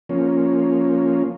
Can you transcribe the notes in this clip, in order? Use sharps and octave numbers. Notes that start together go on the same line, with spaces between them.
F3 A#3 C#4